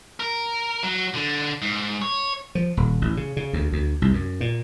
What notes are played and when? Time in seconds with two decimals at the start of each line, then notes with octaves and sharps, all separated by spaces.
0.20 A#4
0.83 F#3
1.15 D3
1.62 G#2
2.02 C#5
2.55 F3
2.77 D#1
3.02 A1
3.17 C#3
3.37 C#3
3.53 D2
3.72 D2
4.02 C2
4.13 F#2
4.40 A#2